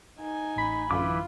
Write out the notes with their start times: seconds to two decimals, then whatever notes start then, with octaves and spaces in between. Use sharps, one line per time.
0.19 D#4 G#5
0.56 A1 B5
0.91 F#2 D3 E3 F4 D6